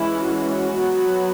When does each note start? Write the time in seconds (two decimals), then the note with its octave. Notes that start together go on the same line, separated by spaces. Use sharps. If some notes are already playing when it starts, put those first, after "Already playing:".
Already playing: E3 G#3 C#4 E4
0.28 F#4
0.72 F#3 B3